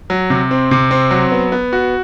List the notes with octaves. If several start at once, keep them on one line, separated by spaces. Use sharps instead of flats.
F#3
C3
C4
C3
C4
F#3
B3
B3
F#4